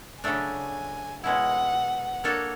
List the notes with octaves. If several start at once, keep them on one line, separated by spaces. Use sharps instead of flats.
C#3 F#3 A3 D4 G#5
B2 G#3 C#4 E4 F#5
A#3 D4 F#4 A4 C#5